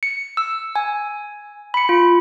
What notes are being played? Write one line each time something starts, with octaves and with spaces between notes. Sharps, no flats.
C#7
E6
G#5
B5 C#7
F4